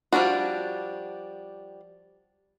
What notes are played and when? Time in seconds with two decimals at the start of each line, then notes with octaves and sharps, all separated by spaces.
0.12 F3 G3 C#4 D4 F#4